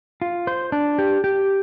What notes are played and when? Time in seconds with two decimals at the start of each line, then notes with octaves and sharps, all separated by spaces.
0.22 F4
0.47 C5
0.72 D4
0.99 G4
1.24 G4